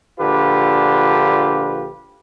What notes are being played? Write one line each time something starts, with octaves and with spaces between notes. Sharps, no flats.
A#1 D3 F4 G4 B4